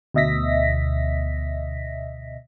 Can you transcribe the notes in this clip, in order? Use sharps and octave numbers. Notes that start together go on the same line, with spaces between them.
D2 B2 D#5 E5 A#6 B6